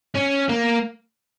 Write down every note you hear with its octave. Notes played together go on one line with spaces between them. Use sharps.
C#4
A#3